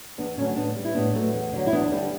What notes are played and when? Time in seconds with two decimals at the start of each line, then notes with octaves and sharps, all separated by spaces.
0.18 E2 B3 D4
0.37 D3 F#3 A3 C#4
0.56 A2 B3 D4
0.76 G3
0.85 E4
0.95 A2 B3 D4
1.14 F#3 A3
1.34 E2
1.53 D3 F#3
1.67 E4
1.72 E2 B3 D4
1.91 D3 G3